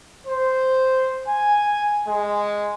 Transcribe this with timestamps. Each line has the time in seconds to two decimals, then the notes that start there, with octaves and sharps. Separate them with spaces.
0.26 C5
1.28 G#5
2.07 G#3